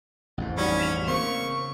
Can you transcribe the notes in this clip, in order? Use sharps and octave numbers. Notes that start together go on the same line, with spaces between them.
A1 F2 G#2
G3 C#4 D#4 F#4
B6 E7 F7
C#3 A#3 C4 C#6